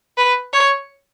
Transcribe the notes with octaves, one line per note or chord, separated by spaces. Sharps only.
B4
C#5